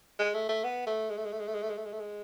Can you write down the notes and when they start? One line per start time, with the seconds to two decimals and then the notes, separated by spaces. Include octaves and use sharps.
0.19 G#3
0.34 A3
0.49 A3
0.64 B3
0.87 A3
1.10 G#3
1.17 A3
1.25 G#3
1.33 A3
1.40 G#3
1.47 A3
1.54 G#3
1.62 A3
1.70 G#3
1.78 A3
1.85 G#3
1.93 A3
2.00 G#3